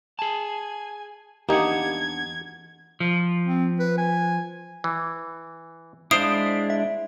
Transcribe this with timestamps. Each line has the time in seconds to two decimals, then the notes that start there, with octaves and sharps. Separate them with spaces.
0.19 G#4 G#5 A5
1.49 E2 A#3 D4 D#4 G4 F#5 G#6
3.00 F3
3.47 C4
3.79 B4
3.98 G#5
4.84 E3
6.11 G#3 D4 E4 C5 F5 D#6 D7
6.70 E5